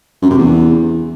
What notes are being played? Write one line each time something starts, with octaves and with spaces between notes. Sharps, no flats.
F#2
C3
E2